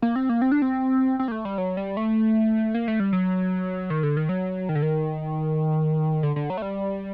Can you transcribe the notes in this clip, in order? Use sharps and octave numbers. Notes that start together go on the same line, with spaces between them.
A#3
C4
A#3
C4
D4
C4
C4
A#3
A3
G3
F#3
G3
A3
A#3
A3
G3
F#3
D#3
D3
D#3
F#3
D#3
D3
D#3
D3
D3
F#3
A3
G3